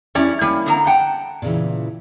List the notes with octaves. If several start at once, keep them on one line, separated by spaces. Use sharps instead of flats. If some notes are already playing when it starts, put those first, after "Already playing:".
G3 C#4 E4 D5
G3 A#3 C#4
D3 B3 A#5
F#5 G5 A5
A#2 C#3 E3